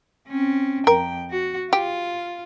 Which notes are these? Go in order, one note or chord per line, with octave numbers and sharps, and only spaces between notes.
C4 C#4
F2 A#4 G5
F#4
F4 G4